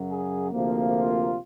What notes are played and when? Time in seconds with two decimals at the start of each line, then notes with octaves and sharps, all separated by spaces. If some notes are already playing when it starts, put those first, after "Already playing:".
Already playing: F#2 C#3 F#3
0.10 G#4
0.52 D2 C3 F3 A#3
0.94 F4